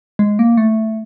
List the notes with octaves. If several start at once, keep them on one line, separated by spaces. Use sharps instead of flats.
G#3
A#3
A3